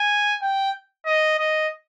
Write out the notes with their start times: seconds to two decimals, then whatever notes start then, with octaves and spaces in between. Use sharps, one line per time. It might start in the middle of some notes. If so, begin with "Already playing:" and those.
Already playing: G#5
0.42 G5
1.06 D#5
1.39 D#5